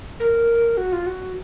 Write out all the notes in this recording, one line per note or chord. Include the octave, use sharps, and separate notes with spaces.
A#4
F#4
F4
F#4